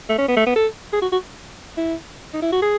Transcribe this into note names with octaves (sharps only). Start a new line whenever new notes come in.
A3
C#4
B3
A3
B3
A4
G#4
F#4
F#4
E4
D#4
E4
F#4
G#4